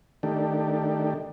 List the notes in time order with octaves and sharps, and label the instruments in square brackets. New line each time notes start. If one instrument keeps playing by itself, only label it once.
[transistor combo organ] D#3 A3 D4 G4